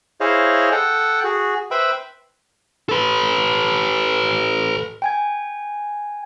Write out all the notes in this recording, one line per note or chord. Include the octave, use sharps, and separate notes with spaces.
E4 G#4 C5 C#5 D#5 F5
A4 F#5 G5
F#4 G#4
B4 C5 E5 G5 B5
A4 B4
G5 G#5 G#6